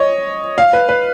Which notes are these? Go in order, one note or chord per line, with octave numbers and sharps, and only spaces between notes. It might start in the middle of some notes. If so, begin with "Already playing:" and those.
Already playing: C#5 D#5
F5
B4
B4